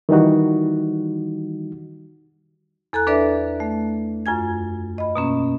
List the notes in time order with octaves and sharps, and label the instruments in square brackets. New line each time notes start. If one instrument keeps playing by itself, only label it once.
[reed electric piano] D#3 E3 G3 D#4 F#4
[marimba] E2 A4 A#5 F#6
D4 A4 B4 D5 E5
A3
F#2 F4 G#5 G#6
D#5 B5
B2 A#3 C#4